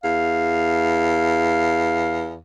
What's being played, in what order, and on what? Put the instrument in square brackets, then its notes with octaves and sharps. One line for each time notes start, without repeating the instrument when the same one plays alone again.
[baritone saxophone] E2 [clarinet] F5